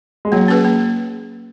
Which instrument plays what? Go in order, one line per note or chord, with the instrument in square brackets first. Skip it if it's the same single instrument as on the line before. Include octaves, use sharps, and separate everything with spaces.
[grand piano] G#3
[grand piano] F#3 [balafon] A#3
[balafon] C#4 G#4 B4
A#3